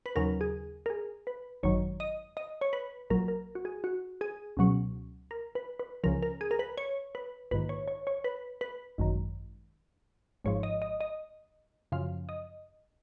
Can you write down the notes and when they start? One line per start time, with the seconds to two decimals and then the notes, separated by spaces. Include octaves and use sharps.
0.06 B4
0.16 D#2 C#3 F#3 A#4
0.41 G#4
0.86 A#4
0.90 G#4
1.27 B4
1.63 G#1 F#2 D#3 F#3 C#5
2.00 D#5
2.37 D#5
2.61 C#5
2.73 B4
3.10 A#1 A#2 F#3 A#4
3.28 A#4
3.55 F#4
3.65 G#4
3.84 F#4
4.21 G#4
4.57 C#2 B2 F#3
5.31 A#4
5.55 B4
5.80 B4
6.04 C#2 C#3 F3 A#4
6.23 A#4
6.41 G#4
6.51 A#4
6.59 B4
6.77 C#5
7.15 B4
7.51 A#1 G#2 D#3 B4
7.69 C#5
7.88 C#5
8.07 C#5
8.24 B4
8.61 B4
8.98 G#1 F#2 D#3
10.44 G#1 G#2 F3 C#5
10.63 D#5
10.82 D#5
11.01 D#5
11.92 F#2 C#3 F3 F5
12.29 D#5